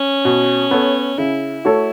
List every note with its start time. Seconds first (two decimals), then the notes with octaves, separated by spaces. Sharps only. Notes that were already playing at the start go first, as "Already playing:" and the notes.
Already playing: C#4
0.25 B2
0.71 B3 A4 C#5
1.18 C#3 E4
1.65 A3 F#4 A4 C#5